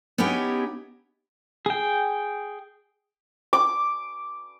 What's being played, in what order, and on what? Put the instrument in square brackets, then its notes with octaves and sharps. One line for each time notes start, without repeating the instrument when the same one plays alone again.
[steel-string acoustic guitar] B3 C#4 D#4 E4 G4 G#4
[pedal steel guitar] G#4 G5
[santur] D6